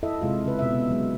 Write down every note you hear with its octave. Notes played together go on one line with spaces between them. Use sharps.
E4 A4 D#5 E5
C3 G#3 F4
C#3 B4
B2 E5
F#3 G#3